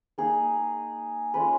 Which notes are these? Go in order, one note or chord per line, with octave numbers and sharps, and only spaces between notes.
A#3 D#4 G#4
G#3 C#4 F4 B4